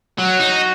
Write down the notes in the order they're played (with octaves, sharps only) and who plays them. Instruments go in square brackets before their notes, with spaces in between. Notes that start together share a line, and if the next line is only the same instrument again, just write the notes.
[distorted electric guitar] F#3 [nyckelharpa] F#4
[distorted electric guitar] D#4